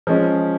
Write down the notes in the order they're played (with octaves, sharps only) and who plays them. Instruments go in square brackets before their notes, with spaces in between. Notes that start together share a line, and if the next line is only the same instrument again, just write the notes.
[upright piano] F3 G#3 C#4